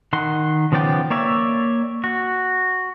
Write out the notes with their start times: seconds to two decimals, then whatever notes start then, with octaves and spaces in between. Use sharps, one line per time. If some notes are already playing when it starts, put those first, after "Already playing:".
0.13 D#3 F#5 C6
0.72 C#3 F3 B3 D5 G5
1.10 A#3 C#5 D5 E5
2.04 F#4